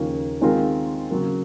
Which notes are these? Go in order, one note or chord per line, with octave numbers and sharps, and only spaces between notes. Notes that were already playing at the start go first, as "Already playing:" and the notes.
Already playing: D#2 C#3 F3 A#3
D#3 G#3 C4 F4 A#4
C#3 F#3 A#3